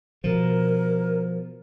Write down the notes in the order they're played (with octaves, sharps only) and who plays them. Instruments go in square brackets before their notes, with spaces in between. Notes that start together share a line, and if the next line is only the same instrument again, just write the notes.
[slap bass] B2 F3 [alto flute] A#4